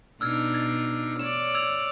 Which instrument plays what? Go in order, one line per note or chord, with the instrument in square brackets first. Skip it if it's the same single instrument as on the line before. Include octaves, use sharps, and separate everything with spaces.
[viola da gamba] B2 D4 D#4 [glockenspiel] E6 F6 G#6
[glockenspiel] G#6 A6
[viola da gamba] C#5 D5 [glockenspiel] E7
[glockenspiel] E6 G#6 F7